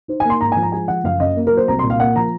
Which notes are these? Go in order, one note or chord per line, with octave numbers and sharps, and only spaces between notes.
D#4 C5
A#3 G#5
C6
G#2 A#5
F3 G#5
A#5
G#3 G#5
F3 F#5
F#1 F5
F#2 D#5
A#3
F#3 A#4
C5
C2 A#5
A#2 C6
F5
A#3 F#5
F3 A#5